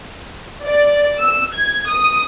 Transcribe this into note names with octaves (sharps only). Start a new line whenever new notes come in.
D5
E6
G#6
D#6